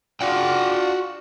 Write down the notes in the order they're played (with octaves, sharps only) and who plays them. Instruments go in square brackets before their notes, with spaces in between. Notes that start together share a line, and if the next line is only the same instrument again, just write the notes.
[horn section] D4 F4 [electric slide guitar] F#4 F#5 G5